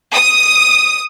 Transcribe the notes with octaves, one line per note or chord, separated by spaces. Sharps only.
D#6